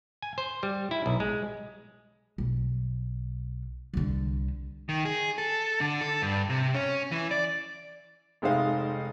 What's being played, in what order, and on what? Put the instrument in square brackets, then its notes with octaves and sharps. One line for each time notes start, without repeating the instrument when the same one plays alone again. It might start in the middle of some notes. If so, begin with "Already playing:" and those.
[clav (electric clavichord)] G#5
C5
G3
E4
B1
G#3
[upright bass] B1
C2 D3
[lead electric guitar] D#3
G#4
A4
D3
A4
G2
C3
C#4
E3
D5
[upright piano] F1 G#3 D#4 C5 F5